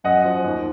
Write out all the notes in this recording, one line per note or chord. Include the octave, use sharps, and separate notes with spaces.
F#2 D#5 F#5
F3
D#2